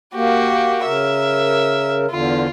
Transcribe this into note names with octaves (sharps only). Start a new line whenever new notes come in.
A#3 F#4 G4
C#3 A#4 E5
E2 D3 F4